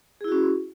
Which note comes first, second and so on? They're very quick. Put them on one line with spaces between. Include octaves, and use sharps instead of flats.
G#4 E4 F#4 C#4